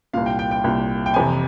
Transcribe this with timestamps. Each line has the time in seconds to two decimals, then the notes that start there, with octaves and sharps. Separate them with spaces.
0.13 C2 A#2 F5
0.26 G5
0.39 G5
0.51 G5
0.64 C2 A#2
1.06 G5
1.14 F2 C3 E3 G#5